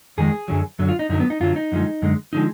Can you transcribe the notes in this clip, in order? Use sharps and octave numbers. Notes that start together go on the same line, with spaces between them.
F2 D#3 G#3 G#4
F#2 D3 F#3
F#2 D3 F#3
F4
D#4
F#2 D3 F#3 D#4
B3
D#4
F#2 D3 F#3 F4
D#4
F#2 D3 F3 G#3
F#2 D3 G#3
D3 F3 G#3 D#4